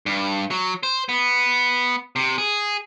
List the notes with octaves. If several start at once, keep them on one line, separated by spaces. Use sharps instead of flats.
G2
F#3
C5
B3
C3
G#4